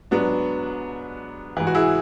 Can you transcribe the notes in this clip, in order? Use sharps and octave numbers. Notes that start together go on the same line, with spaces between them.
G#2 F#3 B3 D4
G#2 E3
F#4
E4 G#4